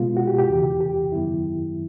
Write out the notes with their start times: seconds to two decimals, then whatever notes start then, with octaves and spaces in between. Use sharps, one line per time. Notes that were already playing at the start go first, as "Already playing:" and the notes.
Already playing: B2 G#3 B3 F4
0.17 F#4
0.27 G4
0.38 G4
0.49 E2 C#3 E3
0.81 G4
1.12 F#2 D#3 F#3 B3 E4